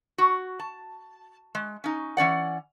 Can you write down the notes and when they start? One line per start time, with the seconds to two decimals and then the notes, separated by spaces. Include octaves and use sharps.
0.18 F#4
0.59 A5
1.55 G#3
1.84 C#4 D#4
2.17 E3 C#4 D5 F#5